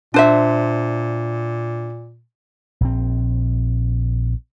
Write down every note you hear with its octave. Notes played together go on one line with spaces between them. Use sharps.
A#2 D4 C5 E5
A#1 C4